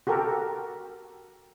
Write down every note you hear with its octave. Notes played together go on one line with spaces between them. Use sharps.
F#4 G4 A4 A#4